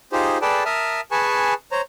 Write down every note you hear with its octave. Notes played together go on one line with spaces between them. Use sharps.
D#4 F4 G4 G#4 C5
G#4 A4 B4 D5 G5 A5
A#4 E5 A5 D#6 F6
G#4 B4 G#5 A5 C#6
C5 C#5 A#5